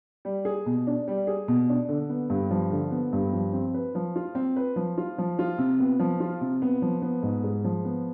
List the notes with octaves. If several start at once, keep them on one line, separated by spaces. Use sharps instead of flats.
G3
G#4
B2
D4
G3
G#4
B2
D4
D3
B3
G2
F3
D3
B3
G2
F3
C4
B4
F3
F4
C4
B4
F3
F4
F3
F4
C3
B3
F3
F4
C3
B3
F3
B3
G#2
G#3
F3
B3